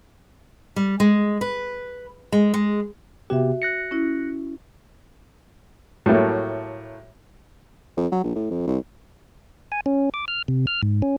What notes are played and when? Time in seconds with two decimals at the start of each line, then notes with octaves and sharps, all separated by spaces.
0.76 G3
1.00 G#3
1.41 B4
2.32 G#3
2.54 G#3
3.30 C3 B3 F#4 G4 E5
3.62 F#6 A#6 C#7
3.91 C#4 E4
6.06 A2 F#3 G3 A3 A#3
7.97 F2
8.12 F#3
8.24 A#1
8.35 A2
8.51 F2
8.67 C2
9.72 G#5
9.86 C#4
10.14 D6
10.28 F6
10.48 C3
10.67 F6
10.83 G#2
11.02 C#4